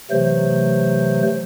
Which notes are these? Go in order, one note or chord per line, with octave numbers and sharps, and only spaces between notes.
C3 E3 F#3 A3 C5